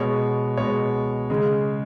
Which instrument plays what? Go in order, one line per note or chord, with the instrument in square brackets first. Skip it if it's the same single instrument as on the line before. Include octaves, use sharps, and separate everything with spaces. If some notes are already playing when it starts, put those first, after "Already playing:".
Already playing: [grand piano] B2 G#3 C#5
B2 G#3 C#5
C#3 G#3